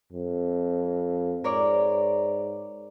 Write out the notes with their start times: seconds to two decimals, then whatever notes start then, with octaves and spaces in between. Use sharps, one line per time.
0.12 F2
1.44 G#2 A#4 C#5 D5